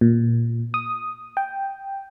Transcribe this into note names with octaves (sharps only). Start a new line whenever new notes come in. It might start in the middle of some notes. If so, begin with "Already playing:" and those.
A#2
D#6
G5